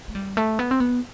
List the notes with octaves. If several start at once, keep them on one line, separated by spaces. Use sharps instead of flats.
A3
G3
A3
B3
C4
B3